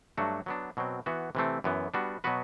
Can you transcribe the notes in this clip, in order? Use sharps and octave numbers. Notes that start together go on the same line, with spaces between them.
G2 F#3 A3 D4 F#4
F#3 B3 D4
B2 F#3 C4
E3 B3 F#4
C3 E3 A3 C4
F#2 E3 B3
G3 B3 D4 F#4
B2 F#3 B3 F#4 B4